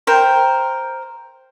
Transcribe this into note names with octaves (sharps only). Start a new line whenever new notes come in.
A#4 C5 G5